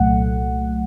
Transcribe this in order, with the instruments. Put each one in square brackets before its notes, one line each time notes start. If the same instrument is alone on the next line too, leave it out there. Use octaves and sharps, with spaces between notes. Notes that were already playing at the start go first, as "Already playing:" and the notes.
Already playing: [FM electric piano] C2 A#2 F#3 A3 F#5